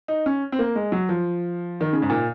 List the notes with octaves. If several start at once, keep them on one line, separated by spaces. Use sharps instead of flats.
D#4
C#4
C4
A#3
G#3
F#3
F3
D#3
C#3
G#2
A#2